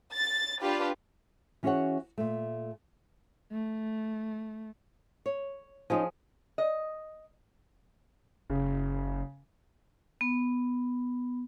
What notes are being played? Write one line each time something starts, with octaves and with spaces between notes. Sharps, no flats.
A6
D4 F4 G4 B4
E3 C#4 F#4 G#4 C#5 F#5
A#2 A3
A3
C#5
F3 C#4 D#4 G#4 C5
D#5
F#1 C#3
B3